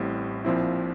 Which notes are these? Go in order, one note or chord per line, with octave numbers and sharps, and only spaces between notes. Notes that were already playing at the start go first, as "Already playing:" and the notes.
Already playing: A1 A2 G3 C4
A#1 A#2 F3 C4 E4